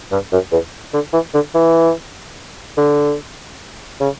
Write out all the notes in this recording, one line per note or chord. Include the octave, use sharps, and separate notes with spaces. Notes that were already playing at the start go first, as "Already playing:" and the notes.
G2
F#2
E2
D3
E3
D3
E3
D3
C#3